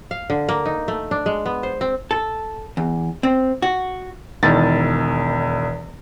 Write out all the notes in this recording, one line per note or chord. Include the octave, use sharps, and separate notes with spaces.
F5
D3
A#3
D#4
A3
D4
G#3
B3
C5
C4
A4
E2
C4
F#4
E1 E2 D#3 A6